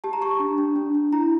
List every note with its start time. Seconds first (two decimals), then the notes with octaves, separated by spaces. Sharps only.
0.04 G4 A5
0.13 A#5
0.22 G4 C#6
0.40 D4
0.58 D4
0.76 D4
0.95 D4
1.12 E4 A#5